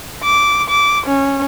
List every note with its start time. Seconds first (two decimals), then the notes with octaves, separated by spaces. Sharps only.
0.23 D6
0.69 D6
1.06 C#4